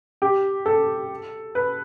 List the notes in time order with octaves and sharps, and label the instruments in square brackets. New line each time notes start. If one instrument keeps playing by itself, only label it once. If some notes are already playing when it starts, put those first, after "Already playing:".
[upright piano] G4
A4
B4